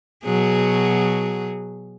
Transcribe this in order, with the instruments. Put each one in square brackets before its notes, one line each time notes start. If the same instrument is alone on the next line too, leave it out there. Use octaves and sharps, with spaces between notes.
[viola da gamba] B2 F#3 G#4